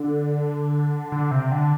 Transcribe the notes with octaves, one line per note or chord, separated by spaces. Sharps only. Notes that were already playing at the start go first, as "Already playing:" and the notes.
Already playing: D3
D3
C3
D3